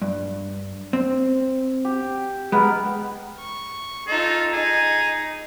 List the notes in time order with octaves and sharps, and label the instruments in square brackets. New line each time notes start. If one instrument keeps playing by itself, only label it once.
[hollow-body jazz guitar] G2
C4
[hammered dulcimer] G4
[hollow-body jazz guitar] G#3 [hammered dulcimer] B3 A#4 B4
[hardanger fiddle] C#6
[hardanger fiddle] D#4 F4 [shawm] A4
[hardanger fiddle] D#4 [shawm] G#4